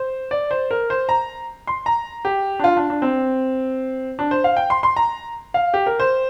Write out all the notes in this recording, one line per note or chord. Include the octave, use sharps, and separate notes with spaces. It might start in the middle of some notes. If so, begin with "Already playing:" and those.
Already playing: C5
D5
C5
A#4
C5
A#5
C6
A#5
G4
D4
F4
D4
D4
C4
D4
C5
F5
G5
C6
C6
A#5
F5
G4
A#4
C5